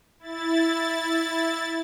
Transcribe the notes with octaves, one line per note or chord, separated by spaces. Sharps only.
E4 A6